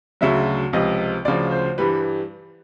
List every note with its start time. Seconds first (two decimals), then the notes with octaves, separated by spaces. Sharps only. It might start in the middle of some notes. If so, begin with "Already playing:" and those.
0.21 D2 C#3 F#3 E5
0.73 C#2 C3 F3 D#5
1.25 D2 C#3 F3 D5
1.51 C5
1.78 G2 E3 G3 B4